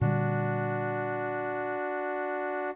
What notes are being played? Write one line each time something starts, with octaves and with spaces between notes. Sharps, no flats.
A#2 D3 G3 D4 F#4